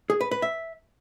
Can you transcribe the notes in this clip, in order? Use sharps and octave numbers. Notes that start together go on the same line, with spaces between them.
G#4
B4
B4
E5